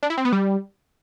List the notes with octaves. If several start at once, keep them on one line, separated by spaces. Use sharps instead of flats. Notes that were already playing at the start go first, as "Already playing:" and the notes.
D4
E4
C4
B3
G3